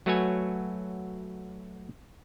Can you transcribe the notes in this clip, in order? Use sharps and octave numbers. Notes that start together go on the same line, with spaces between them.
F#3 A3 F#4 B4 C#5 G#5